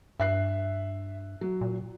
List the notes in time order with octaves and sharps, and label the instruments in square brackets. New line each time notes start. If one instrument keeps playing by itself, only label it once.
[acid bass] G2 [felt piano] E5 F#6 C7
[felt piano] F#3
[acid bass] A#2